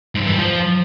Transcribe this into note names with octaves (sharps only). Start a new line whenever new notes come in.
G#2
G2
E3
G3
F3